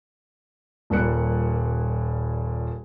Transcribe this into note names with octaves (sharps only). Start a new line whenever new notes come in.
D#1 A#2 G3 A#3 F#6 C#7